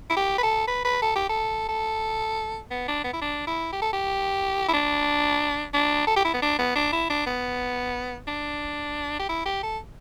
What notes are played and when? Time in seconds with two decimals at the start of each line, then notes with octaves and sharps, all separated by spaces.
0.10 E4
0.17 G4
0.38 B4
0.43 A4
0.67 B4
0.85 B4
1.02 A4
1.15 G4
1.29 A4
1.69 A4
2.71 B3
2.88 D4
3.04 B3
3.13 E4
3.21 D4
3.47 E4
3.72 G4
3.82 A4
3.93 G4
4.68 E4
4.73 D4
5.74 D4
6.07 A4
6.16 G4
6.24 E4
6.34 B3
6.42 D4
6.58 B3
6.75 D4
6.92 E4
7.10 D4
7.26 B3
8.27 D4
9.19 G4
9.29 E4
9.45 G4
9.63 A4